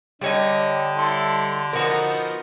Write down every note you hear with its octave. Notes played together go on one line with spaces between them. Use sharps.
D3 G3 C#5 D#5
E4 A4 C6
F3 B3 D#4 F#4 A#4